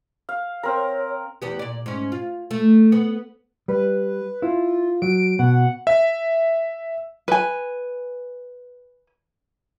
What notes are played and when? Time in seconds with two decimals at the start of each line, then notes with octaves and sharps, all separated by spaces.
0.29 F5
0.63 C4 A#4 C#5
1.42 E2 B3 G4
1.59 A#2 D5
1.86 G#2 C#4
2.12 F4
2.51 A3
2.92 B3
3.68 G3 B4
4.42 E4 F4
5.02 F#3 D7
5.39 B2 F#5
5.87 E5
7.28 B4 G#5